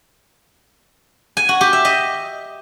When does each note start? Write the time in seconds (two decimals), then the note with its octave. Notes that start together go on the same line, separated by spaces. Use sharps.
1.37 G#5
1.49 F#4
1.61 G4
1.73 E5
1.85 D#5